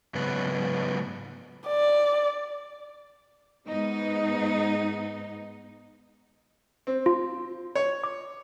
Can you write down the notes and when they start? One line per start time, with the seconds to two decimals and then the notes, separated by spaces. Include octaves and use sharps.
0.14 G#2 C#3 F#3 B3 B4
1.68 D5
3.67 G#2 B3 D#4
6.87 C4
7.06 F4
7.75 C#5
8.04 D6